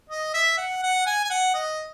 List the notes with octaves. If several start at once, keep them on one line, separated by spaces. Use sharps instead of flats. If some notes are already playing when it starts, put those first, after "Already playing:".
D#5
E5
F#5
F#5
G#5
G#5
F#5
D#5